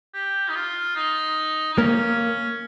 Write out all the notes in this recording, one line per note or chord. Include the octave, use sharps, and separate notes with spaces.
G4
D#4
F4
D#4
D#4
A#3 C#4